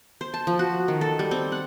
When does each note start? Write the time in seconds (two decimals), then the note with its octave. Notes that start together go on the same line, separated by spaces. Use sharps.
0.21 C5
0.34 A5
0.47 F3
0.59 F#4
0.88 D#3
1.01 A4
1.19 G3
1.31 C4
1.52 F#5